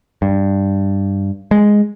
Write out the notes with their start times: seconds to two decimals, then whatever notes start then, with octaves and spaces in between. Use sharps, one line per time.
0.22 G2
1.51 G#3